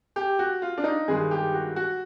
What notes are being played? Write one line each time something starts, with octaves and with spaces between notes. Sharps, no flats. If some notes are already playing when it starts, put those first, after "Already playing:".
G4
F#4
F4
D4
D#4
G2 D#3 G#3 G#4
G4
F#4
F#4